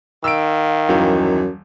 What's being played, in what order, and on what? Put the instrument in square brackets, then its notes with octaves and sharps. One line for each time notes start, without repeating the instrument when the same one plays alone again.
[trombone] D#3 [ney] F5 [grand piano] E6 D7
[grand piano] D#1 E3 [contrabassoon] F#2